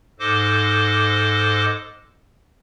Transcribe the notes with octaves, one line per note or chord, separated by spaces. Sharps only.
G#2 A4 C5 D#5 D6